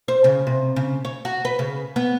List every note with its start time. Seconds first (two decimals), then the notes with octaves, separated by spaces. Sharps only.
0.08 C5
0.24 C#3
0.47 C3
0.76 C#3
1.05 C#5
1.25 F#4
1.45 B4
1.59 C#3
1.96 B3